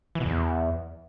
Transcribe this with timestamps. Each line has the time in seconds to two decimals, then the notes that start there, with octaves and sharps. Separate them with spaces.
0.15 E3
0.20 B2
0.25 E2